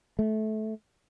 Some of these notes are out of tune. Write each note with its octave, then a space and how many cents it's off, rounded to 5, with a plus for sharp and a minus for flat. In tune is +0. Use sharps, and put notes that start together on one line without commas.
A3 -20